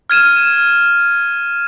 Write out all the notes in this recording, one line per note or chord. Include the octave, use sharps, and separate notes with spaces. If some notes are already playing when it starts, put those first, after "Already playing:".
F6 G#6 D#7 E7